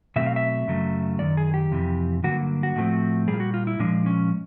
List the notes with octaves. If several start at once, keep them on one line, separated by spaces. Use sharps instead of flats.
B2 F#3 A3 C4 E5
F5
E5
F#2 C#3 F#3 A3
F#2 D#3 D5
G#4
G4
F2 C3 E3
G2 D3 F#3 A#3 F#4
F#4
A2 F3 A3 C4
A#2 G3 G#4
F4
F#4
F4
E4
A#2 F3 G#3 D4
C#4